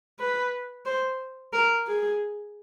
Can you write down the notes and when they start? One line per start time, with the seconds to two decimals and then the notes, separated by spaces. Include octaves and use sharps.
0.19 B4
0.86 C5
1.53 A#4
1.87 G#4